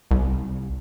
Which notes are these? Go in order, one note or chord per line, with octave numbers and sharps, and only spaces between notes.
C2